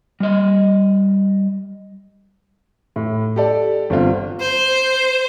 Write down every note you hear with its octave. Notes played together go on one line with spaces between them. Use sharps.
G3 D#5
A2
G4 A4 D5
G1 C4 F4
C5